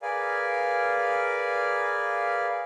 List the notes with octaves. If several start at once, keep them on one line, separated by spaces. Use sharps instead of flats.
G#4 A#4 B4 D5 F5 G#5